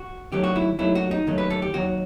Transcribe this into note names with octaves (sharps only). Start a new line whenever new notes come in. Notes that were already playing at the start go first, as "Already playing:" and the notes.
Already playing: F#4
D#2 D#3 F#3 A3 G4
F#4
E4
D#2 D#3 F#3 A3 E4
F#4
D#4
D#2 D#3 F#3 A3
B4
A4
G4
D#2 D#3 F#3 F#4